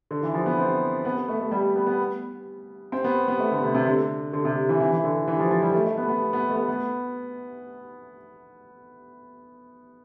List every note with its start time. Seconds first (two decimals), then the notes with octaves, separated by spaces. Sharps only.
0.11 D3
0.23 E3
0.34 F3
0.46 B3
0.58 C4
1.05 B3
1.17 B3
1.28 A3
1.40 A3
1.51 G3
1.76 B3
1.87 B3
2.92 C4
3.04 B3
3.28 B3
3.39 A3
3.52 D3
3.63 C3
3.74 C3
3.86 D3
4.33 D3
4.45 C3
4.69 E3
4.80 E3
4.92 E3
5.04 D3
5.28 E3
5.40 F3
5.50 F3
5.62 G3
5.75 A3
5.85 A3
5.98 B3
6.09 B3
6.33 B3
6.49 A3
6.56 B3
6.69 B3